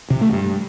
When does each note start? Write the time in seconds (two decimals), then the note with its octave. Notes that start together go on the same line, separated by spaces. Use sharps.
0.10 C3
0.21 A3
0.32 G2